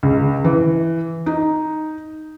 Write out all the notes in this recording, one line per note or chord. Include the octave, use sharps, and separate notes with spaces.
C#2
E3
D#4